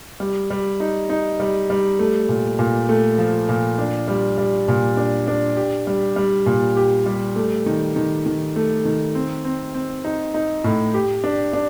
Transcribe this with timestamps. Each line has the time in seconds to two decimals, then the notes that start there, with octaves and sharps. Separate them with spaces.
0.20 G3
0.50 G3
0.80 D#4
1.10 D#4
1.40 G3
1.70 G3
1.99 A3
2.29 A#2
2.59 A#2
2.89 A3
3.18 F3
3.49 A#2
3.79 D4
4.08 G3
4.38 G3
4.68 A#2
4.97 D4
5.27 D4
5.57 G4
5.87 G3
6.16 G3
6.46 A#2
6.77 G4
7.06 G3
7.36 A3
7.66 D#3
7.96 D#3
8.26 D#3
8.56 A3
8.85 D#3
9.15 C4
9.45 C4
9.74 C4
10.05 D#4
10.34 D#4
10.64 A2
10.94 G4
11.24 D4
11.53 D4